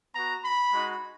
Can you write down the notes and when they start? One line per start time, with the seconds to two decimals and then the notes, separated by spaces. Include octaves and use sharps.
0.15 B3 F#4 A#5
0.45 B5
0.74 G#3 D#4 F#4